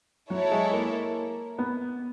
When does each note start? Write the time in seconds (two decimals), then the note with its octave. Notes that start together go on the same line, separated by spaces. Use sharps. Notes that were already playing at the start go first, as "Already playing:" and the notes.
0.30 F#3 E4 A4 C#5
0.51 G#3
0.73 A#3
1.59 B3